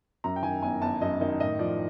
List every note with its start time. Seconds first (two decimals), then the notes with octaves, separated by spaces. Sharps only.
0.24 F#2 A#5
0.36 G5
0.43 D#3 G#5
0.62 G1 G#5
0.81 G1 A5
1.01 F#2 D#5
1.21 D#3 D#5
1.40 A2 D#5
1.59 F3 D5